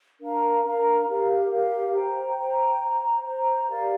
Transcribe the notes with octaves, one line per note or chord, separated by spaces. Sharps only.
D4 A#4 F5 A#5
D4 A#4 F5 A#5
G4 A#4 F5
G4 A#4 F5
C5 G5 A#5
C5 G5 A#5
C5 A#5
C5 A#5
G4 A#4 D5 F5